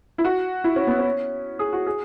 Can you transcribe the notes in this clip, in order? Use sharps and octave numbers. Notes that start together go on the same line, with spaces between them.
E4
F#4
E4
C#4
B3
C#4
G#4
F#4
G#4